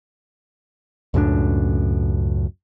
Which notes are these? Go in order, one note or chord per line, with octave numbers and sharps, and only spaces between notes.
C#2 F#2 A2 D4